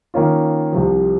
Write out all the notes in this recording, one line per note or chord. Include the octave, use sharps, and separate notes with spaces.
D#3 A#3 C#4 F4
C2 C3 F3